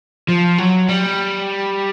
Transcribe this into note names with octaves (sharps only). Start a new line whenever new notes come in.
F3
F#3
G3